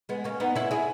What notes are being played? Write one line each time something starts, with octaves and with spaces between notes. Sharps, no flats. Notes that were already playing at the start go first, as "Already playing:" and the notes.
G#3 B3
A#3 C#4
B3 D#4
C#4 E4
E4 G#4